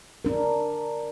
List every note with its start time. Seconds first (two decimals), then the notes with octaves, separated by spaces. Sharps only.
0.25 D4 A#4